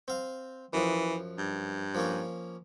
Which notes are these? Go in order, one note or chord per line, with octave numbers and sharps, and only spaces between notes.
C4 F5
F#2 E3 F3
G2
F3 A#3 C#4